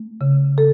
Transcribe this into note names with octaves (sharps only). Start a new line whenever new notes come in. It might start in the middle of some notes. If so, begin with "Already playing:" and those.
Already playing: A3
C#3
A4